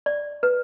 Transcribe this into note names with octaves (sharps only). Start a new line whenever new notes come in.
D5
B4